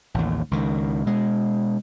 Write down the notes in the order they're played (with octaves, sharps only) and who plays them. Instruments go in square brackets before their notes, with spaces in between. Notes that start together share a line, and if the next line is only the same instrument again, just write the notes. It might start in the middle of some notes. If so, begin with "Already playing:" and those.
[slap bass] A1 D#2
C#2 D#3
B2 G#3